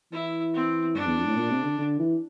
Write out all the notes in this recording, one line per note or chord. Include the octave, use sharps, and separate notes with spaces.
E3 E4
C4
G2 D4
E2
F2
A2
A#2
C3
D3
D3
E3